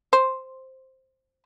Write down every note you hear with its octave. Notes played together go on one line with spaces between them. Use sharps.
C5